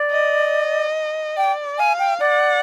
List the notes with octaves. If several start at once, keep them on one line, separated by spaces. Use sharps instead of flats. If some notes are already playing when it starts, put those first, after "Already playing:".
Already playing: D5
D#5
D5 G5
F5 G#5
G5
D5 F#5